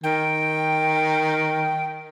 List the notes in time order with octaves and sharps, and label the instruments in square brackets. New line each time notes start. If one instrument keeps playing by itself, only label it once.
[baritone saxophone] D#3 [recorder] G5